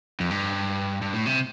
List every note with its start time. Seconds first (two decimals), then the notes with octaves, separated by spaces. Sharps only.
0.20 F2
0.31 G2
1.02 G2
1.14 A2
1.27 C3